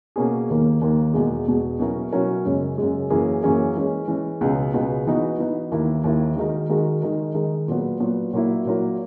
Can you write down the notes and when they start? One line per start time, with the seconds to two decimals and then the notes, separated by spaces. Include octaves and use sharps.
0.16 B2 A#3 C#4 G#4
0.49 D#2 D#3 A#3
0.81 D#2 D#3 A#3
1.14 E2 B2 G#3
1.47 E2 B2 G#3
1.79 B2 F#3 C#4 E4 A#4
2.12 B2 F#3 C#4 E4 A#4
2.45 F#2 C#3 G#3
2.78 F#2 C#3 G#3
3.10 F#2 E3 A#3 C#4 G#4
3.43 F#2 E3 A#3 C#4 G#4
3.76 E3 G#3 C#4
4.08 E3 G#3 C#4
4.41 C#2 B2 G#3 B3
4.74 C#2 B2 G#3 B3
5.06 E3 B3 D#4 F#4
5.38 E3 B3 D#4 F#4
5.71 D#2 D#3 A#3 E4
6.04 D#2 D#3 A#3 E4
6.36 D#3 G#3 D#4 F#4 A#4
6.69 D#3 G#3 D#4 F#4 A#4
7.02 D#3 G#3 D#4 A#4
7.35 D#3 G#3 D#4 A#4
7.68 A#2 F#3 B3
8.00 A#2 F#3 B3
8.33 A#2 F#3 A#3 E4
8.65 A#2 F#3 A#3 E4